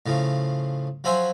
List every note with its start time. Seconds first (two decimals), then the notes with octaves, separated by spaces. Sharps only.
0.06 A2 C#3 F3
1.04 F3 F#3 C5 E5 G#5 C6